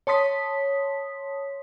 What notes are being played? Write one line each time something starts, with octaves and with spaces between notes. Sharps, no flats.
C#5 A5 C6 D#6 B6